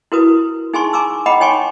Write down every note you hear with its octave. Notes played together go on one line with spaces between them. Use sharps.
E4 F#4 A#4 B4 D#6
D#4 G#4 G#5 A5 C6 C#6
G#5 A#5 C#6 D6 E6
D#5 F#5 G5 A#5 B5 D6
D#4 C#5 G5 G#5 C6 C#6